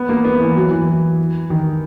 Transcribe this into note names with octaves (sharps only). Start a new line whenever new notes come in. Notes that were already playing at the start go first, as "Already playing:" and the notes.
Already playing: B3
A#3
B3
E3
F#3
E3
D#3